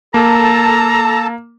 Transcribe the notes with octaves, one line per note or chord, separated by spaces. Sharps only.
A#3 A4 A5 A#5